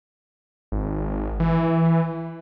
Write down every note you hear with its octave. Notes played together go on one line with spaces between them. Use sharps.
G#1
E3